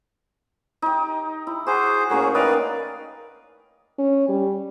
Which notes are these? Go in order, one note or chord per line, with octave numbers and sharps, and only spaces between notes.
D#4 G4
E4
F#4 G#4 C5
A2 A#3 C#4 F#4 G#4
D#3 B4 D5 D#5 F5
C#4
G3